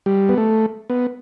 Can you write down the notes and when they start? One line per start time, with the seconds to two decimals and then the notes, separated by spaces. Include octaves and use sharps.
0.06 G3
0.29 B3
0.38 A3
0.90 B3